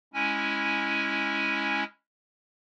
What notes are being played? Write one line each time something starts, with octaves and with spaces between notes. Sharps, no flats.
G#3 C#4 E4 G#5